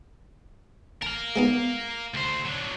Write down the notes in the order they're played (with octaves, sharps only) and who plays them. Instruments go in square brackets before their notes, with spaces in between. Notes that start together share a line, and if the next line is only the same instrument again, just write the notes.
[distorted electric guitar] A#4 F5 [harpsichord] A5
[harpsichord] G#3 B3 D#4
[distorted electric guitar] D2 C5
F#3 D4